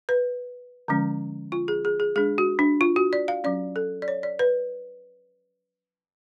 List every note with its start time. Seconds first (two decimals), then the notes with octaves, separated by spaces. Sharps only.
0.09 B4
0.88 D3 F3 G#3 C#4
1.52 F4
1.68 G#4
1.85 G#4
2.00 G#4
2.16 G#3 D4 G#4
2.38 F#4
2.59 D4
2.81 F4
2.96 F#4
3.13 D5
3.28 F5
3.44 F#3 C#4 D5
3.76 A4
4.02 D5
4.08 C#5
4.23 D5
4.39 B4